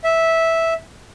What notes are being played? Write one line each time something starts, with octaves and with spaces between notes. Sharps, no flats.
E5